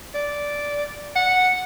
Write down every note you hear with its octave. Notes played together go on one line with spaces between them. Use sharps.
D5
F#5